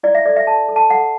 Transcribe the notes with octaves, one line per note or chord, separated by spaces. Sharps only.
E4 D5
E5
A4 D5
E5
A4 A5
A4
A5
A4 F#5